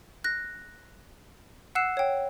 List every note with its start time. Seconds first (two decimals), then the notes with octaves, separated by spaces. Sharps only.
0.24 F#6 A#6
1.75 F#5 E6 F#6 C7 E7
1.97 C#5 G5